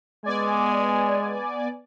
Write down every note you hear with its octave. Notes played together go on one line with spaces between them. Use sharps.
G#3 B3 D5 G#5